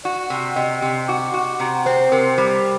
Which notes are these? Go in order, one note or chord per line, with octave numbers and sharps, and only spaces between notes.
F#4 D5
C3
C3 D#5
C3 C6
F#4 D6
F#4 D6
C3 A#5
C4 C5
C3 A#4
G3 C5